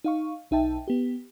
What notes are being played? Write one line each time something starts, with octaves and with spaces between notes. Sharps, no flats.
D#4 F5 C#6
B1 D#4 E5 G5 A5
B3 G4